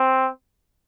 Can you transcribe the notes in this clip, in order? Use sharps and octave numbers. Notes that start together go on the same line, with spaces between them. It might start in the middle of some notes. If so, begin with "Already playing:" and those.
Already playing: C4